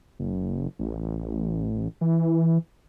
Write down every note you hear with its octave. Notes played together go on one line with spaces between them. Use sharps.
F#1
A1
E3